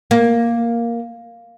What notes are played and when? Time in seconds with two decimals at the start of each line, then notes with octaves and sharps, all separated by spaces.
0.11 A#3